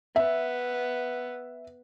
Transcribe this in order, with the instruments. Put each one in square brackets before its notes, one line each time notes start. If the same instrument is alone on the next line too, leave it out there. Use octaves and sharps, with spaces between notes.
[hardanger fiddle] B3 [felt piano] E5